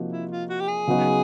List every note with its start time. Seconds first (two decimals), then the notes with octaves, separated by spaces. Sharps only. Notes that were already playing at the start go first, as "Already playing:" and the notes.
Already playing: C3 F3 A#3 D#4 F#4
0.12 E4
0.31 F4
0.50 F#4
0.60 G4
0.68 G#4
0.87 C#3 F#3 B3 D#4 F#4